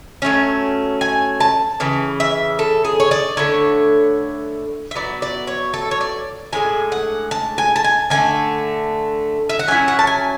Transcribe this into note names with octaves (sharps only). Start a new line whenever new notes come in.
F#3 A3 C#4
G#5
A5
C#3 E3
E5
A4
G#4
C#5
D5
D3 A3 E4 C#5
E5
F#3 B3 E4 D5
D5
C#5
A4
C#5
D5
A2 G#3 D4 G#5
F#5
A5
G#5
A5
G#5
D3 A3 D4 G#5
E5
F#5
F#3 C#4 E4 G#5
F#5
A5
G#5